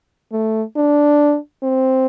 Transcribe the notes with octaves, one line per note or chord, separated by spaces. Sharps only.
A3
D4
C4